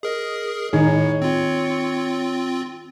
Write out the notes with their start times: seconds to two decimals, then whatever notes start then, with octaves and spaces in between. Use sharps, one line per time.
0.03 G#4 A#4 D#5
0.73 A2 D#3 D#4 G#4 C#5
1.22 C4 F4